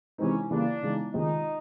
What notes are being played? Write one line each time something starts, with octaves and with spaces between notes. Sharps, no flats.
C3 E3 G#3 C4 C#4 D#4
C#3 E3 G3 A#3 D4
C#3 E3 G#3 B3 D#4
C#2 C3 D#3 G#3 D#4